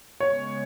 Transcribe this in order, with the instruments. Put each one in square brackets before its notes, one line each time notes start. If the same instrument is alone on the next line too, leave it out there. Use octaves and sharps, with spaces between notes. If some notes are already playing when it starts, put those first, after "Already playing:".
[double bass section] C#3 G#3 B3 [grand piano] C#5